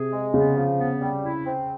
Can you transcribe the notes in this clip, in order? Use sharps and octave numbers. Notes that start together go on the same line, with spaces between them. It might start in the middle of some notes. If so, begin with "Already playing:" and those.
Already playing: C3 G#4
G#3
C#3 B3
F3
B3
G3
E4
C4